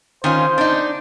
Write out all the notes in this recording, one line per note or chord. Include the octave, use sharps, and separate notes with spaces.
D#3 C#4 F4 C5
D4 D#4